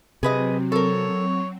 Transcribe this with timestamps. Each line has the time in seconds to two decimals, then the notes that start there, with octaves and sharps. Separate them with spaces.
0.23 C3 F#3 C4 G#4 B4 D#5
0.72 A4 A#4 C#5